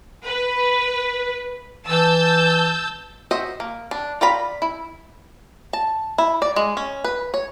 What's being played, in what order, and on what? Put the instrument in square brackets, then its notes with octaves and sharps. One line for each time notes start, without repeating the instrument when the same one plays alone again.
[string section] B4
[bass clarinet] E3 [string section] A5 E6 G6
[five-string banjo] F#4 C5 D#5 E5
A#3
D4
F4 D5 A#5 B5
E4
A5
E4
D5
G#3
C#4
B4
C#5